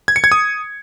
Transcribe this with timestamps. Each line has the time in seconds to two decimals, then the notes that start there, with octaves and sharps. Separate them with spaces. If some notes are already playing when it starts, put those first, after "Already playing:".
0.08 G#6
0.16 C#7
0.24 G#6
0.32 D#6